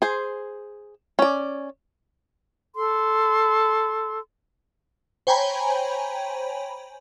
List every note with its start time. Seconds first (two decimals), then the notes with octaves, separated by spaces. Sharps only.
0.02 G#4 C5
1.19 C#4 D5
2.75 A4 C6
5.27 C5 C#5 G5 G#5 A#5 B5